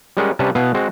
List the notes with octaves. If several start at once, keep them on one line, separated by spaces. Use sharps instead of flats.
G3 G#3 C#4 A#4 D#5 F#5
C3 G3 C#4 B4 A5
B2 B3 E4 B4 F5
G#3 C4 F#4